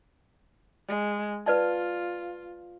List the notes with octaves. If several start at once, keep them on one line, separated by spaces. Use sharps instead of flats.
G#3
F4 B4 D5 A5